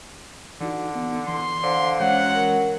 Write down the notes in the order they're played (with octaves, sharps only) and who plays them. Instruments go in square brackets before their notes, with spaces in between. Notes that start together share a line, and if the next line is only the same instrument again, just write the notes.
[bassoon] D3 [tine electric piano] E3 D#4 F#4
[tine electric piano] B3
[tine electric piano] E3 [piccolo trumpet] C6
[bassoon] D3 [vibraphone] C5 F5
[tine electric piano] E3 G#3 C#4 [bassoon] F#3 [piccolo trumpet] F#5
[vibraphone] A#4